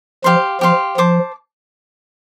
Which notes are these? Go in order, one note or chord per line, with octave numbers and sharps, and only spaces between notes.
F3 G4 F5 C6
F3 G4 F5 C6
F3 C5 A5 D6